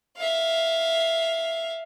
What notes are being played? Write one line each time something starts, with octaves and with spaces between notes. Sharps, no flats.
E5 F5